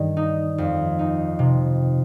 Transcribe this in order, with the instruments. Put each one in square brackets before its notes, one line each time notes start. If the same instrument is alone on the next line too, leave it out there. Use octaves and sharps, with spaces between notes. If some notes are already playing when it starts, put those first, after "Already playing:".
Already playing: [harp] G2 D#3 G3
D#4
F2
D#4
C3